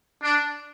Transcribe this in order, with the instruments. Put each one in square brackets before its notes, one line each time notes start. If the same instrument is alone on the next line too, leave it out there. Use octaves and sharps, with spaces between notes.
[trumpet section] D4